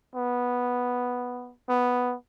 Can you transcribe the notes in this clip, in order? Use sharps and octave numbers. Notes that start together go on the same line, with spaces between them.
B3
B3